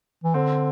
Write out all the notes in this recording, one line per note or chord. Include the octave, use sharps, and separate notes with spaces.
E3
D3 C4